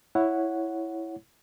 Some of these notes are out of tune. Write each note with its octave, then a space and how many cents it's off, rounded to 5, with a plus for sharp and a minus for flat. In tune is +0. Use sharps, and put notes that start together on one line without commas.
E4 +0 C#5 +0 F#5 +0